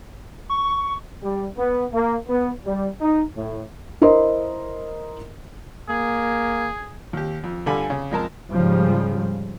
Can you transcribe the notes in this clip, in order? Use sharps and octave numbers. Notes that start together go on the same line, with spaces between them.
C#6
G3
B3
A#3
B3
G3
D#4
A2
E4 A#4 C5 D#5 C6
A#3 G#4
D#2 G4
F2
G2 D3 F4 A4 G#5 B5
C#3
F2 G#3 A#4 A5
G#2 C#3 F3 G3